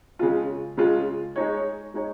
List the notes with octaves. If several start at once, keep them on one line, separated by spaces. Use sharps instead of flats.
C#3 G#3 F4
C#3 G#3 F4
G#3 D#4 C#5
G#3 D#4 C#5